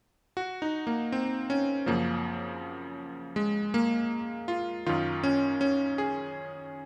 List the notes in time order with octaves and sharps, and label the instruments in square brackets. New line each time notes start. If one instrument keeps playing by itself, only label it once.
[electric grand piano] F#4
D#4
A#3
C4
C#4
F#2 C#3 F3 A#3
G#3
A#3
F4
F#2 D#3 F4
C#4
C#4
G#4